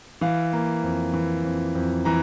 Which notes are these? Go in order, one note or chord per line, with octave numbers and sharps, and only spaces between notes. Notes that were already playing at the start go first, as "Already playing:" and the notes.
E3 F5
A#3
F2
E3
F2
F2
E3 A#5